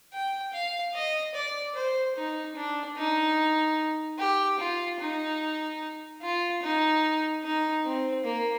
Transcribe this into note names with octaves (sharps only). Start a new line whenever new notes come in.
G5
F5
D#5
D5
C5
D#4
D4
D#4
G4
F4
D#4
F4
D#4
D#4
C4
A#3